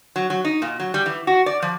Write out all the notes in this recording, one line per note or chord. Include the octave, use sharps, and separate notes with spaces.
F#3
F#3
D#4
A#2
F#3
G3
E3
F#4
D5
F3